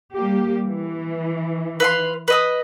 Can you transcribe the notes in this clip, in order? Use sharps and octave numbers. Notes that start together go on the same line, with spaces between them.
G3 A#3 G4
E3
B4 F5 C6
B4 D#5 D#6